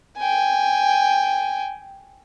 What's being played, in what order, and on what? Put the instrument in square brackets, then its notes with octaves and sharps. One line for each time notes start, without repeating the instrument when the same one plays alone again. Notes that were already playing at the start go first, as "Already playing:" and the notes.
[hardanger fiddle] G5 G#5